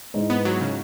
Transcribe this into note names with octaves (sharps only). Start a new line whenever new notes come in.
G#2 G#3 E4
B3
F#3
C#3